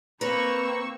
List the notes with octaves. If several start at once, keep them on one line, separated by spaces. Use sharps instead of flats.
A#3 C4 B4 A#5 C#6 E6